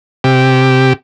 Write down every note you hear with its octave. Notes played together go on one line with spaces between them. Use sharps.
C3 G4